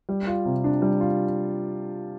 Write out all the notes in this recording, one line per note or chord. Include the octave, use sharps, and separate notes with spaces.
G3
F4
C3
D4
G3
F4